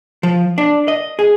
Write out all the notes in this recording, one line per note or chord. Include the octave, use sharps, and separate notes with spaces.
F3
D4
D#5
G#4